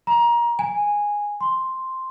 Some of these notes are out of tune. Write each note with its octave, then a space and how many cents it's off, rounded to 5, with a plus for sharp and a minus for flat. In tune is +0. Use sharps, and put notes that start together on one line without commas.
A#5 +25
G#5 -10
C6 +0